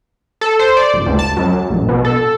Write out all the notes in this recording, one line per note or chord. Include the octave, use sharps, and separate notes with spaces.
A4
C5
D5
G1
D2
A5
F#2
A#1
B2
A4